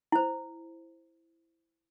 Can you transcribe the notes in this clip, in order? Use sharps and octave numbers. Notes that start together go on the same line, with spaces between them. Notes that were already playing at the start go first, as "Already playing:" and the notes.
E4 C5